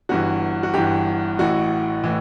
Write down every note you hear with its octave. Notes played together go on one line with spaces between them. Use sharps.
G1 G2 E3 F#4
F#4
G1 G2 E3 G4
A1 A2 E3 F#4
A2 E3